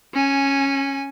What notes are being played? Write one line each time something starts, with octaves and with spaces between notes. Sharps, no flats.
C#4 G#5